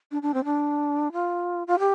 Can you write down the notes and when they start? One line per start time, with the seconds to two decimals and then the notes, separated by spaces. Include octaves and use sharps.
0.11 D4
0.22 D4
0.34 C4
0.45 D4
1.12 F4
1.67 F4
1.79 G4